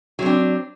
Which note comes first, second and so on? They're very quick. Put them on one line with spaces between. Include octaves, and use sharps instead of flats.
F#3 C4 D4